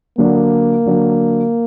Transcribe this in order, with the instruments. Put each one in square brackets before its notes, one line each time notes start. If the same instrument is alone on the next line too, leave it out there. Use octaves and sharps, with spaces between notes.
[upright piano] D3 F#3 D4 [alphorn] A#3
[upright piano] D3 F#3 D4